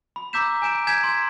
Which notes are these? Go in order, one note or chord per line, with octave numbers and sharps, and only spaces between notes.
B5
A#5 D6 E6 G6 B6 E7
G#5 G6 D7 E7
G#5 G6 G#6 B6 E7
C6